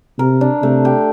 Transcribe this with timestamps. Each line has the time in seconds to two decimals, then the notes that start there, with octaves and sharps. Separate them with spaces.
0.18 C3 A#4
0.41 D4
0.62 C3 A3
0.85 G4